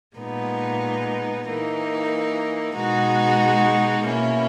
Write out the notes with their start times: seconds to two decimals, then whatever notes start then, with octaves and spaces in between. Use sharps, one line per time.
0.17 A#2 G#3 B3 D#4
1.47 E3 A#3 D#4
2.75 B2 G#3 D#4 F#4
4.04 B2 A#3 C#4 E4